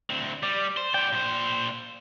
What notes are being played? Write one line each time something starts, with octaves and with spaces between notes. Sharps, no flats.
D2 C4
G3 D5
C5
B3 D5 G5
A#2 C5